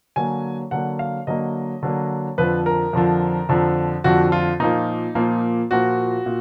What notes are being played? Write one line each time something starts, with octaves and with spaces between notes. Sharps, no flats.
D3 F#3 A#3 G#5
D3 F#3 A#3 F#5
F5
D3 F#3 A#3 D#5
D3 F#3 A#3
F2 D3 F3 B4
A#4
F2 D3 F3
F2 D3 F3
F2 D3 F3 F#4
F4
A#2 F3 A#3 D#4
A#2 F3 A#3
A#2 F3 A#3 F#4
A#2